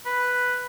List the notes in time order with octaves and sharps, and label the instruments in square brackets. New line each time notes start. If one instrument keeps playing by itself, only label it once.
[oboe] B4